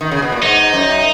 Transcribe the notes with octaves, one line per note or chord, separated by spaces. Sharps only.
D#3
C#3
B2
A#2
G#2 D#4
F#2